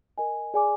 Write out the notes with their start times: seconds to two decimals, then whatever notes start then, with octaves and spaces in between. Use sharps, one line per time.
0.18 A#4 D#5 G#5
0.54 G#4 D5 G#5 D6